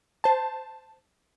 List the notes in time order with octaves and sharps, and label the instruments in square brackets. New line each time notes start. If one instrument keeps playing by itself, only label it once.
[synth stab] C5 A5